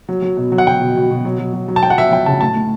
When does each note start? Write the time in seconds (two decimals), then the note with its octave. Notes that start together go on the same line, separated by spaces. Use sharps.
0.09 F#3
0.22 F#3
0.37 B2
0.52 F#3
0.58 F#5
0.66 F#3 G5
0.81 B2
0.96 B2
1.11 B2
1.25 F#3
1.39 F#3
1.53 F#3
1.68 F#3
1.76 A5
1.83 F#3 G5
1.90 F#5
1.98 F#3 E5
2.11 F#3 G5
2.26 C#3 A5
2.41 A2 A5
2.55 A2